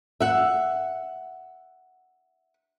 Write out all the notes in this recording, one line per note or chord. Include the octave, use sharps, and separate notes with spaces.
E5 F#5